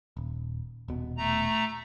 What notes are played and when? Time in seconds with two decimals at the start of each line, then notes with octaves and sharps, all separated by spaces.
0.17 D#1
0.88 D#1 B2
1.17 A3 A#5